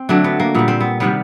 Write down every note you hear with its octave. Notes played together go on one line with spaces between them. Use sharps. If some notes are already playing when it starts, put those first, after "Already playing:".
Already playing: C4
D3 F#3 A3 D4
B3
A#3
A#2 G3 B3
C4
B3
C3 D#3 G3 B3